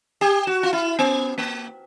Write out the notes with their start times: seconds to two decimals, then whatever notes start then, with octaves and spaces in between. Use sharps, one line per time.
0.21 G4
0.47 F#4
0.63 F4
0.73 E4
0.99 B3
1.38 A#3